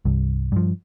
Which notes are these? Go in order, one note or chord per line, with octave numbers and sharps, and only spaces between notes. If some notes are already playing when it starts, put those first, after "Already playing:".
C2 G2
G2 F3